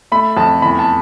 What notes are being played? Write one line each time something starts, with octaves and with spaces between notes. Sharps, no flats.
A3 B5
F2 A5
E2 B5
A5